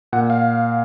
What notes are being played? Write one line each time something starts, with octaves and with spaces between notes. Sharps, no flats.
A#2 F#5
F5